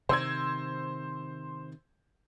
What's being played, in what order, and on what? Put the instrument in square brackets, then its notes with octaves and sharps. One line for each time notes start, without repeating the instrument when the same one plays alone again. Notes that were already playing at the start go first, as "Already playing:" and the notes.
[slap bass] C3 D#3 [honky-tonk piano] C5 E6 G#6